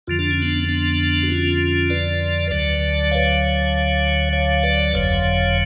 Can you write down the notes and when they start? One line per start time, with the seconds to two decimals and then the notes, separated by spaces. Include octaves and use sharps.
0.07 F2 D3 F3 F4
0.19 D4
0.31 C#4
0.42 B3 D4
0.69 B3 D4
1.23 F#4
1.30 C#4 F4
1.90 B4 D5
2.51 D2 D3 F#3 B4 D5
3.11 C#5 F5
4.33 C#5 F5
4.63 B4 D5
4.94 F#1 F2 D3 F#3 C#5 F5